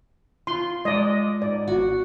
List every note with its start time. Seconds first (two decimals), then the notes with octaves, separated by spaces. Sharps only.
0.47 F4 C6
0.85 G#3 D5 D#5
1.42 G#2 D5
1.68 G#1 F#4